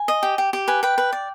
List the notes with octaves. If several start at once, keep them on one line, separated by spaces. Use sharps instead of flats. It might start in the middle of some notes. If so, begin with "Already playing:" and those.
Already playing: G#5
D#5
G4
G4
G4
B4 G#5
B4 G5
B4
D5